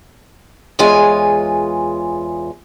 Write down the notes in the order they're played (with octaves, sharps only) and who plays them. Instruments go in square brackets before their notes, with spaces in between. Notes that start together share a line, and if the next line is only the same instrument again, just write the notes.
[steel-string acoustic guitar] E2 G#3 F4 C#5 G#5